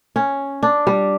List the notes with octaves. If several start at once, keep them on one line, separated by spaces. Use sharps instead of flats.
C#4
D4
G3